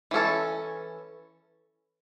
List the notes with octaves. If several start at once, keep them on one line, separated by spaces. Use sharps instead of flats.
E3 C#4 A4